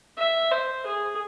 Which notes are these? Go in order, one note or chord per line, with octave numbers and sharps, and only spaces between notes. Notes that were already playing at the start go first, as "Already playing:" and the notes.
E5
C5
G#4